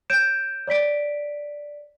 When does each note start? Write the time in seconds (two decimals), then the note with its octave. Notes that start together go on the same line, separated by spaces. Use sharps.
0.10 C#5 G6 D7 E7
0.67 C#5 D5 B6 D7